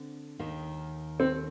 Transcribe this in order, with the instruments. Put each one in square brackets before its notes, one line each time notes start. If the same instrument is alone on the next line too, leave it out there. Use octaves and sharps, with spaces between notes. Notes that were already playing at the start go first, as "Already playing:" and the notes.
Already playing: [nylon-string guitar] D3 C4
D#2 D#3 A#3
[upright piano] C4